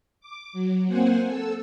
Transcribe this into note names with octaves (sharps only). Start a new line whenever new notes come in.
D6
F#3
A#3 C4 C5 F#5 G#5
A4 E6